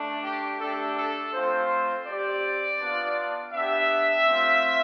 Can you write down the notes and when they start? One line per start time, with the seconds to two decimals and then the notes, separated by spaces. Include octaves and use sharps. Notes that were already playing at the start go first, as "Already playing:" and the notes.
Already playing: A3 D4
0.24 G4
0.60 A3 D4 G4 A4
0.97 A4
1.34 A3 C4 F4 C5
2.06 C4 G4 D5
2.79 B3 D4 F4
3.53 B3 D4 G4 E5
4.25 A3 C4 F4